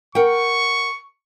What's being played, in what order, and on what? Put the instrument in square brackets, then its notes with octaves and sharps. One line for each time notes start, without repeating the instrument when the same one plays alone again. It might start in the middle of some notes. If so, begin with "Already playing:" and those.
[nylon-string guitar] A#4 F#5 G5 [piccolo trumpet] C#6